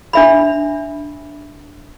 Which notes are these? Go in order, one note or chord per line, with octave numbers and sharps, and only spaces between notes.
D4 E5 B5